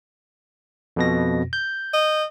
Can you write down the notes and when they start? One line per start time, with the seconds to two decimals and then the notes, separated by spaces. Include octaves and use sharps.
0.96 F2 B2 A#6
1.53 G6
1.94 D#5